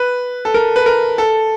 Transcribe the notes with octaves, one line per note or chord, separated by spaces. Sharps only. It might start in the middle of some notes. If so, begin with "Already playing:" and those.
Already playing: B4
A4
A#4
B4
A#4
A4